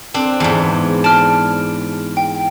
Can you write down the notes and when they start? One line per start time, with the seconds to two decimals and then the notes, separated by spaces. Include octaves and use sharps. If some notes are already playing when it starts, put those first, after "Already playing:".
0.14 C4 D4
0.40 E2 G#2
1.04 D5 A5 F6
2.17 G5